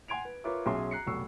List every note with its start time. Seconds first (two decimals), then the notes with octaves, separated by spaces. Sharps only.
0.08 F#5 G#5 C6 G#6 D7 F7
0.25 B4
0.44 F4 A#4 B4 C#5 E5 D6
0.66 B1 C#4 G#4 E5 G#5 C6
0.91 A#5 F#6 C7 C#7
1.07 F1 B1 C#6 E6 C7